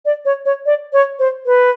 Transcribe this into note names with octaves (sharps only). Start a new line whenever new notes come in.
D5
C#5
C#5
D5
C#5
C5
B4